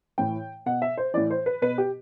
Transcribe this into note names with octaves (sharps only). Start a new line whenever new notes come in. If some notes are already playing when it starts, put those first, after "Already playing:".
A2 E3 G5
B2 F#5
E5
C5
A2 E3 D5
C5
B4
B2 B4
G4